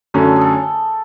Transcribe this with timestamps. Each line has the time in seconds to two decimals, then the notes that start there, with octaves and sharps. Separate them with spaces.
0.14 F#2 D3 F#3 A3 C#4 A4
0.36 G#4
0.41 A4